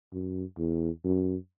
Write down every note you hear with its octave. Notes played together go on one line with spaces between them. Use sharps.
F#2
E2
F#2